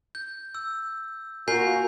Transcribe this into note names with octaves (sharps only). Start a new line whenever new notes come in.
G6
E6
A#3 F4 F#4 A#4 G#5 G6 C7